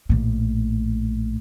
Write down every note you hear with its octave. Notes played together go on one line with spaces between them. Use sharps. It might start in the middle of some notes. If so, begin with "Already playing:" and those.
A#1 A2